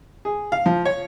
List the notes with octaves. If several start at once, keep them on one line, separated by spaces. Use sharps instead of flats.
G#4
F5
F3
C#5